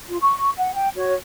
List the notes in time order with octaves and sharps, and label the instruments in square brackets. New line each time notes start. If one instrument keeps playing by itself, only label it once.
[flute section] F4
C#6
F#5
G5
F#4 C#5